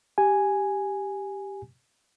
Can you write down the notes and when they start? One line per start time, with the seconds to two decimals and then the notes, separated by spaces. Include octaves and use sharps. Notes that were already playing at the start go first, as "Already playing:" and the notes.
0.18 G4 G#5